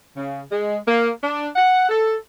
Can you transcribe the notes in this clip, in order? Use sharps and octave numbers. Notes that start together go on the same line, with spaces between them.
C#3
G#3
A#3
D4
F#5
A4